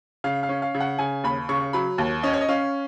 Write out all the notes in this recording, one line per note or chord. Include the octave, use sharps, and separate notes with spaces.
C#3 F5
F5
C#4
F5
C#3
F#5
C#3 G#5
D#2 B5
C#3 C#6
F#3 B5
D#2
C#4 D#5
C#5
D#5
C#4 F5